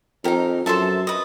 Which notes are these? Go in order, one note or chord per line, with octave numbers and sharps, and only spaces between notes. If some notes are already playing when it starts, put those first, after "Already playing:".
F2 D#4 G4 A#4
F#2 A4 C5 E5 A5
B4 D#5